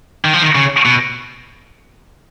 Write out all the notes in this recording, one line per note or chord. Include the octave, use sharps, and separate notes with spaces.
D#3
F3
D#3
C#3
B2